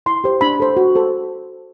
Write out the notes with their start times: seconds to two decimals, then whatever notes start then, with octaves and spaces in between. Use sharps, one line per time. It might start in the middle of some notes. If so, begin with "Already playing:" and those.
0.06 E4 C6
0.24 G4 C5
0.41 D4 B5
0.60 A4 C5
0.77 F#4
0.95 A4 C5